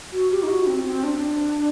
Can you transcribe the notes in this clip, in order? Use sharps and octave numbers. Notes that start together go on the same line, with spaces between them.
F#4
G4
D#4
F#4
C4
C4
D4